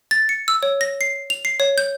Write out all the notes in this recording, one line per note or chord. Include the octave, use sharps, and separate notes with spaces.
A6
C#7
E6
C#5
A#6
C7
F7
C7
C#5
G6